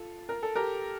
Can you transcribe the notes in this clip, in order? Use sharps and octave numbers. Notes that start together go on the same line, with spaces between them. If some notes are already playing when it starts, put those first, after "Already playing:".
Already playing: F4 A4
A#4
A4
G4 A#4